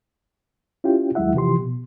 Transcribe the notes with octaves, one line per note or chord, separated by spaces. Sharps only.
C#4 E4 F4 G4 G5
D#2 F#3 G#3 E4 E5 F#5
C3 E3 F3 G4 C6
B2